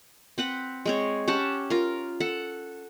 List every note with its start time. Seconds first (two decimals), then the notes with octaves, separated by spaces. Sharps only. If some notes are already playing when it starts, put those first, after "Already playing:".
0.38 C4 B4 F#5
0.86 G#3 C4 C#5
1.28 C#4 G4 F#5 A5
1.70 F4 A#4
2.20 A4 F#5